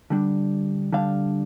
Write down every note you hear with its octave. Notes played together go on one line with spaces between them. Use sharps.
D3 G3 D4
D3 G3 D4 F5